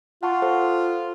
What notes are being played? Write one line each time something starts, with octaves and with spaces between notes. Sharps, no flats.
F4 F#5 A5 C#6
A4 C5